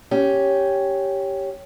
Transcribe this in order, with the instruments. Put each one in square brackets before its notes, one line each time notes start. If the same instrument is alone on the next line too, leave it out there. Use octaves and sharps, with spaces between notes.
[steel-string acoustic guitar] C#4 G4